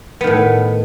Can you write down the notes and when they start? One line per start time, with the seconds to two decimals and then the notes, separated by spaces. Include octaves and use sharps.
0.21 B3
0.24 D#3
0.27 A2